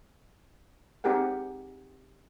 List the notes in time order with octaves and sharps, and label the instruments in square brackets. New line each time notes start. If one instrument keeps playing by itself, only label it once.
[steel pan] C4 D#4 G4 G#4 A#4 F#5